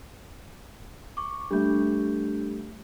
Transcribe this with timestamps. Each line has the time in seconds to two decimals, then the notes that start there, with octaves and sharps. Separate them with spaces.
1.17 C#6 D6
1.51 G3 A3 D4 G6